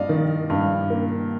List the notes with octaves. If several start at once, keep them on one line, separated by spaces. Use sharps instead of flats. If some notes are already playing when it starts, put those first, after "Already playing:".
Already playing: G2 A#3 D5 D#5 F5
D#3
G2
A#3